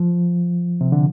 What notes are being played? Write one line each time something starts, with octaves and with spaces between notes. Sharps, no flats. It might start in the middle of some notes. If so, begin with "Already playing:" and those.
Already playing: F3
C3
D3